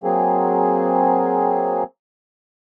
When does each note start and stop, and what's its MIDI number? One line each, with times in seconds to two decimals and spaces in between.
0.04 1.83 54
0.04 1.83 58
0.04 1.83 60
0.04 1.83 68